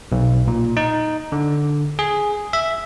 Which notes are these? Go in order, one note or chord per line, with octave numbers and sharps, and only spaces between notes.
B1
A#2
D#4
D3
G#4
E5